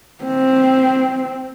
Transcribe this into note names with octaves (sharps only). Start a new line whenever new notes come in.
C4